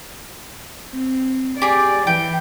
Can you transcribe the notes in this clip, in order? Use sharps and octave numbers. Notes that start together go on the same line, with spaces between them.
C4
G4 G#4 D5
E3 G5